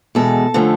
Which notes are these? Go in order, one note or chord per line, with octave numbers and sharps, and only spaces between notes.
E2 B2 G#3 A4
D3 F3 A3 C#4